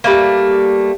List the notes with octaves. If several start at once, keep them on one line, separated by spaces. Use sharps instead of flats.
G3 A3 A#3